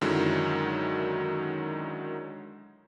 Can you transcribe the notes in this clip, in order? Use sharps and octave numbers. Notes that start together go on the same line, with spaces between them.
F#2 D3 D#3 F#3 G#3 E4